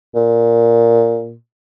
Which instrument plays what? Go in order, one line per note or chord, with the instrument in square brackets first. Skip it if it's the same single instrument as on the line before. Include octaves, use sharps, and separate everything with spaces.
[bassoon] A#2